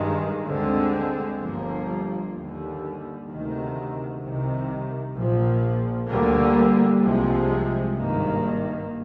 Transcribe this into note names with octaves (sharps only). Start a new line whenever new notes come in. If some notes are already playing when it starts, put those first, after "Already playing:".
Already playing: G2 D#3 G#3
D2 D3 G#3 C4
G1 G2 F3 A#3
D#2 D3 G3
D2 C3 D#3
C2 C3 D#3
A#1 A#2 F3
D2 D3 G3 A#3
C2 C3 F3 G#3
G#1 G2 D#3 A#3